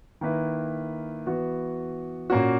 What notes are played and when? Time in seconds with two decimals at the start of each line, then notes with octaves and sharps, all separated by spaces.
0.21 D#3 A#3 E4 B4
1.26 E3 B3 F#4
2.30 A#2 A#3 C#4 F#4